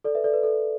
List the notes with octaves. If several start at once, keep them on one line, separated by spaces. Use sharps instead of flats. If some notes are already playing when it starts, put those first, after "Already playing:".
A4 D5
B4 E5
A4 D5
B4
A4